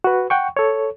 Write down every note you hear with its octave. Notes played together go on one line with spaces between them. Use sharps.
F#4 B4
F#5 G5 C#6
A4 C#5